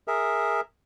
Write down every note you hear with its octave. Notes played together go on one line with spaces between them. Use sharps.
G#4 A#4 E5